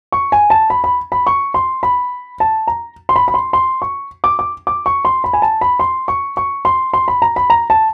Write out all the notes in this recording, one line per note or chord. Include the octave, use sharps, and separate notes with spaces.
C#6
G#5
A5
B5
B5
B5
C#6
C6
B5
A5
A#5
C6
B5
B5
C6
C6
C#6
D6
D6
D6
C#6
C6
B5
G#5
A5
B5
C6
C#6
C#6
C6
C6
B5
A#5
B5
A#5
A5